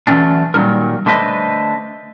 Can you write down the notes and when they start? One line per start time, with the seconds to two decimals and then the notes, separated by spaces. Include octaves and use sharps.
0.07 D3 E3 F#3 A3 C#4 D4
0.54 A#2 D#3 F#3 G3 D#4 A#4
1.06 D3 A3 D4 B4 C5 D#5